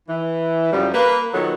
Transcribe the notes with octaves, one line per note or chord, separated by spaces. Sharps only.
E3
F#2 C#3 F3 G3
A#3 B4
A#2 D#3 F#3 B3 A4